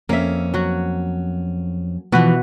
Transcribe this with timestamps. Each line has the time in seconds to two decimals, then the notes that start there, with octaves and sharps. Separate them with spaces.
0.09 F2 A#3 C#4 E5
0.54 F#3 F#4
2.12 B2 E3 F3 F#4 B4